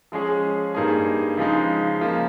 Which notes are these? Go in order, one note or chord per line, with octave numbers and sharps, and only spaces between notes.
F3 G#3 C#4 G#4
G2 G3 A#3 D#4 G#4
C#3 F3 G#3 D#4
C#3 F3 A#3